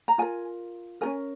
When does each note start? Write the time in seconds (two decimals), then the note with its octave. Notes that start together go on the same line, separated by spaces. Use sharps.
0.08 A#5
0.18 F4 A#4 G#5
1.01 C#4 F#4 A#4 G#5